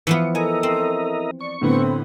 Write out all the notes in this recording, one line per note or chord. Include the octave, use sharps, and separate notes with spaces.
E3 F3 B3 C#7
E4 A4 A#4 D#5 G#5
C4
D5 C#6
A2 D3 B3 C4